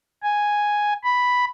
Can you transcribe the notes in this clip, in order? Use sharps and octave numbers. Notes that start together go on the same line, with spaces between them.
G#5
B5